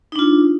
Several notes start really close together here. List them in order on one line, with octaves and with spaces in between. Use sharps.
D#4 D4 F4